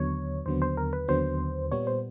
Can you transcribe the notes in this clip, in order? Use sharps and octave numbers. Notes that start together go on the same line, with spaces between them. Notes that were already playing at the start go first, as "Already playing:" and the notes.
Already playing: D#2 D3 F#3 B3 C#5
D#2 D3 F#3 B3 C5
C5
A#4
B4
D#2 D3 F#3 B3 C5
A#2 G3 B3 C#5
C5